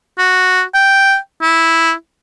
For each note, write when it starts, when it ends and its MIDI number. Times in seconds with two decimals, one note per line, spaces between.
0.18 0.62 66
0.74 1.16 79
1.42 1.92 64